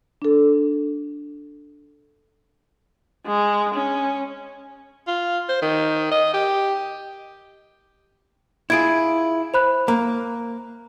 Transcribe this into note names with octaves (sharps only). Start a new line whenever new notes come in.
D4 A4
G#3
C#4
F4
C5
D#3
D#5
G4
E4 F4 G#4 G#6 D7
C5 B5 F#6
A#3 A#5